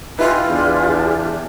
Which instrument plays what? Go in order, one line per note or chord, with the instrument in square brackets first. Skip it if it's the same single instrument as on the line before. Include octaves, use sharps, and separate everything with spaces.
[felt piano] E4 B4 [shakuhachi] F4 [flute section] G4 D#5 G#5
[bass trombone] E2 [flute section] D4 G4 G#4